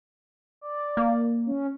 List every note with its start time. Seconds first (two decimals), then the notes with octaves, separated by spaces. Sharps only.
0.61 D5
0.97 A#3
1.46 C#4